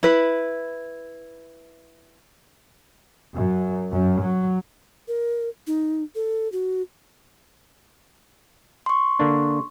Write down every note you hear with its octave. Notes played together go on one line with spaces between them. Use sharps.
E4 B4
F#2
F#2
F#3
A#4
D#4
A4
F#4
C6 C#6
D3 A#3 D4